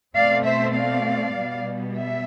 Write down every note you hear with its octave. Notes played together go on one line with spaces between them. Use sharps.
B2 A3 C4 D5 F5
C5 E5
D5 F5
B2 G3 B3
E5